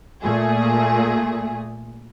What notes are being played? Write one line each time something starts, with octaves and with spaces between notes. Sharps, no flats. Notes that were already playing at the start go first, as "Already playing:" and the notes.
A#2 A3 G#4